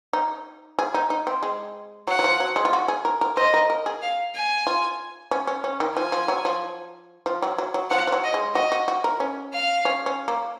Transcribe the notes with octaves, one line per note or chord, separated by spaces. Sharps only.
D#4
G#4
D#4
D#4
C4
G#3
F#3 F#5
F#3
F3
F#3
G#3
F4
F#4
G#4
A#4
A#4
C5 D#5
A#4
A#4
G#4
F5
G#5
F4
C#4
C#4
C#4
D#3
F3 G#5
F3
F#3
F3
F3
F#3
F#3
F#3
F3 F#5
F3
F#3
D#5
G#3
F#4 D#5
F#4
F#4
A#4
C#4
F5
C#4
C#4
A#3